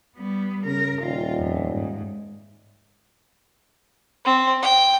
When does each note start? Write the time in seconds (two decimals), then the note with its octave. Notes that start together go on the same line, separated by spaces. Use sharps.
0.16 G3 B3
0.66 C#3 A#4
1.02 D#1 F4
1.38 F2
1.72 G#2
4.25 C4
4.62 G5